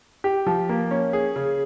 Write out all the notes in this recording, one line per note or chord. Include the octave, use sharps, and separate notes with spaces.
G4
F3
A#3
C#4
G#4
C#3